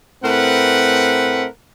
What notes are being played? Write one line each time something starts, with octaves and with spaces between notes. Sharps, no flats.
A2 A3 C4 A#4 B4 F#5